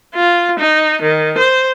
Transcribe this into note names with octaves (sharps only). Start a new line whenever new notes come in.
F4
D#4
D#3
C5